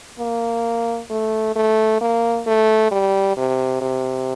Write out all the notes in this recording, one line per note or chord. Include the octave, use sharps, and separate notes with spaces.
A#3
A3
A3
A#3
A3
G3
C3
C3